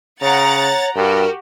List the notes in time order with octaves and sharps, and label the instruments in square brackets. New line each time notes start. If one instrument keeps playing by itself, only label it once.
[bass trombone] C#3 [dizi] C#5 [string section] F#5 A#5 A6
[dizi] C#5
[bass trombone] G2 [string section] F#4 G4 [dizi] A#4